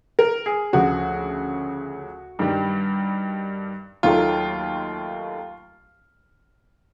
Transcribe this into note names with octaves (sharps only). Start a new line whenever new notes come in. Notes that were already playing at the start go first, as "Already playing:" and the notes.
A#4
G#4
D2 C#3 F3 F#4
G2 D#3 G3
D#2 D#3 F#3 A3 F4